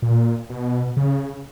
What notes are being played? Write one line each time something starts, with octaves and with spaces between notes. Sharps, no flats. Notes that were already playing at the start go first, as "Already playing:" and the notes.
A#2
B2
C#3